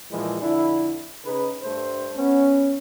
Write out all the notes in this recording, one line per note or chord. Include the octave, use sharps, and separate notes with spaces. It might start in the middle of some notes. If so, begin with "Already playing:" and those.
A#2 E3 F3 G#3 G#4
F2 D3 D4 E4
C#3 D#4 G#4 B4
G2 A3 C5
B3 C#4